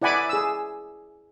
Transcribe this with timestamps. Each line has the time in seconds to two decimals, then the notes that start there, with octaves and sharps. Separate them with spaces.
0.02 E4 D5 F#5 G#5 B5 D6
0.29 G#4 E6